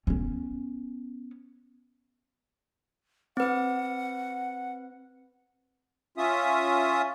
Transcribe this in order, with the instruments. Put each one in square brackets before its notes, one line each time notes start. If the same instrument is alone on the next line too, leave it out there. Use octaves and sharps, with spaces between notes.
[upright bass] B3 C#4
[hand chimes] C4 B4 [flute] F#5
[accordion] C#4 F4 E5 D#6